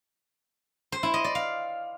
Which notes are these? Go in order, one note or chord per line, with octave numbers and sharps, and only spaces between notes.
C5
E4
D#5
D5
F5